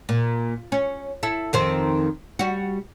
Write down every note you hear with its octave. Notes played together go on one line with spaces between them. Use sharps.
A#2
C#4
E4 A4
F2 D#3 C4
G3 F#4